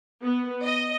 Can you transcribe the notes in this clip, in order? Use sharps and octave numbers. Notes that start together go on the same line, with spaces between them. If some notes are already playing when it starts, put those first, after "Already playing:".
B3
D#5